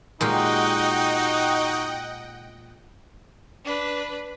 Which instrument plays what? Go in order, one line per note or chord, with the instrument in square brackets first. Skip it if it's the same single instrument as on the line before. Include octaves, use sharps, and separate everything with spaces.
[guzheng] A#2 G#3 G4 [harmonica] D#4 F#4 [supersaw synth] D#5 F#5 G5
[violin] D4 B4